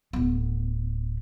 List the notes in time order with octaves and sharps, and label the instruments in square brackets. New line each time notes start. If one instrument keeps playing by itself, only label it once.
[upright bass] D1 B3